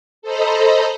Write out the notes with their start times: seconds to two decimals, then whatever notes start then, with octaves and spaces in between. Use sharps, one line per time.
0.22 A4 C5 D#5 A#5 B5